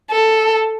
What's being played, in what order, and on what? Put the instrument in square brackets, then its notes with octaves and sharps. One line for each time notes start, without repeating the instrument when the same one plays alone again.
[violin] A4